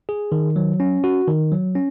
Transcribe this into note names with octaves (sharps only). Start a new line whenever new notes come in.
G#4
D#3
F#3
C#4
F#4
D#3
F#3
C#4